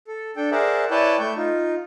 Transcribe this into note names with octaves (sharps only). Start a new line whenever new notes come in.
A4
D4 A4 G5
G#4 A#4 C5 D5 E5 F#5
E4 B4 C#5 D5 G5 A5
A3 C#6 G6
D#4 F4